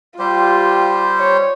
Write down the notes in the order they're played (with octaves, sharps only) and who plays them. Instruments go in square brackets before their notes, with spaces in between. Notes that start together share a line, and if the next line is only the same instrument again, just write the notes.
[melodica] G3 G4 C5 [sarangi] F4
[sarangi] C#5